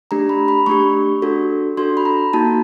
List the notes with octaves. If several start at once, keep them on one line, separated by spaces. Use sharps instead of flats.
A3 D4 G4 A#5
B5
B5
A3 D4 G4 C#6
D4 F#4 A4
D4 F#4 A4 C6
B5
A#5
A#3 D#4 F#4 A5